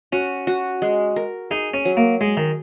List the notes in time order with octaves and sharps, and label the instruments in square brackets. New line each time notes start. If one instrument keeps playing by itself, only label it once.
[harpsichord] C#4 [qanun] F#4
[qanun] F#4
G#3
A#4
[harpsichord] D#4 [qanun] G#4
[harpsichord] C#4
[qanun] F#3
[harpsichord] A#3
[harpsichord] G#3 [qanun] G#4
[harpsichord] D#3